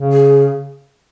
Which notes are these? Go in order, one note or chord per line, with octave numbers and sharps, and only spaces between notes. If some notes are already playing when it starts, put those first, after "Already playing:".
Already playing: C#3
G#4